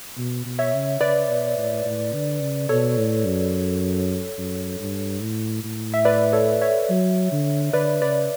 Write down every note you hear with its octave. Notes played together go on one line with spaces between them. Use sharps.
B2
B2
C#5 E5
C#3
C#3 B4 D5
B2
A2
A2
D3
C#3
B2 A4 C#5
A2
F#2
F#2
G2
A2
A2
E5
B4 D5
A4 C#5
C#5 E5
F#3
D3
D3 B4 D5
C#3 B4 D5